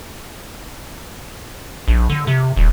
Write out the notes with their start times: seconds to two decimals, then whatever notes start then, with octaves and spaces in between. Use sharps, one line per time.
1.88 A#1
2.10 D3
2.27 C3
2.56 D#1